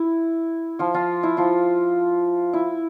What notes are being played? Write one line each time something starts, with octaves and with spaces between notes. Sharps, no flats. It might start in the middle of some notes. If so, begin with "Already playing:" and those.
Already playing: E4
F3 F4
F3 F4
E4
F3 F4
E4